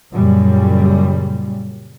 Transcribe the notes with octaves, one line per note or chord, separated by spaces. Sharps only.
F#2 A#2 C#3 G3